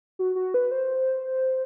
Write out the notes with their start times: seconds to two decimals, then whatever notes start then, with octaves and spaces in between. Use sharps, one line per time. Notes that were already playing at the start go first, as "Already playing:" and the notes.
0.19 F#4
0.35 F#4
0.54 B4
0.72 C5